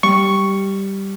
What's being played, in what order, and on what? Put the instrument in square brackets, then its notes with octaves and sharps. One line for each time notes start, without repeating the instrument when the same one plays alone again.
[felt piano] G3 [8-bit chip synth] C#6